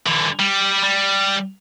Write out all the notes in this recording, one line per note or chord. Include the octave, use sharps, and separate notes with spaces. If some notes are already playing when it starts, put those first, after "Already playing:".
D3 E3
G3
G3